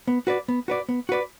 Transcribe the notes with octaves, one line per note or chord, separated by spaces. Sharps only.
B3
F#4 B4 D5
B3
F#4 B4 D5
B3
F#4 B4 D5